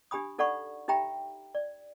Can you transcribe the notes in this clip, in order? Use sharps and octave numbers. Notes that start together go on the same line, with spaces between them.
D4 G4 G#5 B5 D#6
D#4 A4 D5 F#5 B5 C#6
D#4 G4 E5 G5 A#5 B5
D5